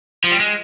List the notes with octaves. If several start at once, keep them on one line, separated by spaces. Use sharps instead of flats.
F3
G3
G#3